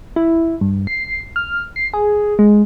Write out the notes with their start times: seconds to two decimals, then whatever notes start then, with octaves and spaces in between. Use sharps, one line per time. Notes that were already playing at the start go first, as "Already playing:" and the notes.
0.16 E4
0.61 G2
0.87 C7
1.36 F6
1.76 C7
1.93 G#4
2.39 G#3